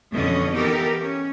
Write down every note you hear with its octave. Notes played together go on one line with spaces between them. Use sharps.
F2 B2 D3 E3 C#4 D#5
E3 B3 D#4 G4 A4 A#4
C#4